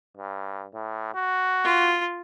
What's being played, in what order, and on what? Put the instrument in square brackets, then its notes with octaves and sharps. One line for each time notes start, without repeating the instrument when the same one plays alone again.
[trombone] G2
A2
F#4
[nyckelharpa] F4